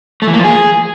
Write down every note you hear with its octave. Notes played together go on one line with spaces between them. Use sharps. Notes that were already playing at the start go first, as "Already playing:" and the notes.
A3
E3
A#3
F3
G#4